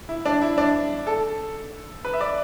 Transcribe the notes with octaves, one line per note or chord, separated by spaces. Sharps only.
E4
D4
E4
D4
A4
B4
E5
D5